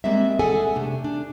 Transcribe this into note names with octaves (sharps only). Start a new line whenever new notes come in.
G3 G#3 A#3 C4 E5
G#4 A4 E5 F#5 G#5
C3 A3 D4
D4